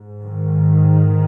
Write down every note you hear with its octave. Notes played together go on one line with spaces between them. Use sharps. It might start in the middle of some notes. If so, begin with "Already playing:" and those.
Already playing: G#2
D#3